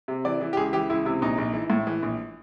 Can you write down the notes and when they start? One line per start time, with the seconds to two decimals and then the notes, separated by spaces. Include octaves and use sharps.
0.08 C3
0.25 E3 D5
0.41 E3
0.53 G4
0.57 C#2 G#4
0.73 E3 G4
0.90 C#2 E4
1.05 C3 E4
1.22 A#1 D#4
1.38 A#1
1.53 E3
1.70 A2
1.87 E3
2.02 A#1